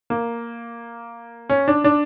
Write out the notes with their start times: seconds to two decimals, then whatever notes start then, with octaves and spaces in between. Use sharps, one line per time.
0.10 A#3
1.49 C#4
1.68 D4
1.84 D4